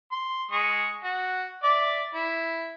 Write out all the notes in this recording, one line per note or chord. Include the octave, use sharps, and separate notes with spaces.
C6
G#3 C#6 D#6
F#4
D5 E5 D6
E4